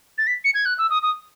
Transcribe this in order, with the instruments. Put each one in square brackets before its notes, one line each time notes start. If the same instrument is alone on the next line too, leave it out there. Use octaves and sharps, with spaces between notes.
[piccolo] A6
B6
C#7
G#6
F#6
E6
D#6
D#6